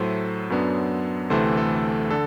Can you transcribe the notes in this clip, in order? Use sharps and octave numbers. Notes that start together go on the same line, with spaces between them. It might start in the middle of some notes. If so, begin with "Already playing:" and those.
Already playing: A2 F#3 A3 A4 C5
F#2 F#3 B3 D4
D2 C3 E3 A3 A4 C5
A4
D3 A4